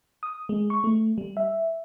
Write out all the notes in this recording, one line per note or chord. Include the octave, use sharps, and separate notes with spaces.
D#6
G#3
C#6
A3
G3
E5